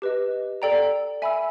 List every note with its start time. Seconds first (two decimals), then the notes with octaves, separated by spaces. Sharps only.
0.02 G4 B4 D#5
0.62 A4 D5 G5 A#5
1.22 E5 G#5 B5 E6